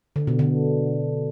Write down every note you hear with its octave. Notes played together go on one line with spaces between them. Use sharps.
D3
B2
D3